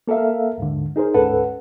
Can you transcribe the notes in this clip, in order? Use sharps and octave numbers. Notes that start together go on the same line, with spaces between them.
A#3 A4 A#4 E5 F5
D#2 G#2 D3
D#4 G#4 A#4 C5
D2 G#2 C#4 A4 B4 F#5